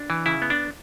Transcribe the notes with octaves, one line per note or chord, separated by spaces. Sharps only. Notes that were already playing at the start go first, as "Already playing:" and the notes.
Already playing: D4
E3
C#3 E4
B3
D4